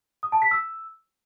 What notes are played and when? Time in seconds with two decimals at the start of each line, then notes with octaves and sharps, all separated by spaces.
0.23 D#6
0.32 A5
0.42 B6
0.51 E6